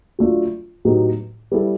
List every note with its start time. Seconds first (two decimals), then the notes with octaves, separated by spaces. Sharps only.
0.19 F#3 A3 D4 F4
0.85 A2 F#3 B3 D#4 G4
1.52 G3 B3 E4 A4